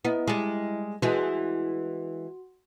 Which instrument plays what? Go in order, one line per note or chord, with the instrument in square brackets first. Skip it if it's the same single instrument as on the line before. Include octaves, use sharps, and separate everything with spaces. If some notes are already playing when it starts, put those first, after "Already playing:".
[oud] B3 [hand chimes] E4 D#5
[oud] G3 G#3
[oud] E3 G#3 [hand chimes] F#4